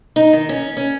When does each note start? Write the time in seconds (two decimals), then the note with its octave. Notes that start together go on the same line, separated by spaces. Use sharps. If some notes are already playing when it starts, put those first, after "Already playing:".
0.16 D#4
0.33 D#3
0.49 C#4
0.77 C#4